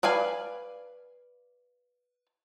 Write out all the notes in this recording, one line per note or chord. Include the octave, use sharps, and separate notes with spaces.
B4 D5 F5 G#5